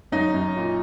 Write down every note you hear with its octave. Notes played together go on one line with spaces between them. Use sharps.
F#2 D#4
F#2
A#2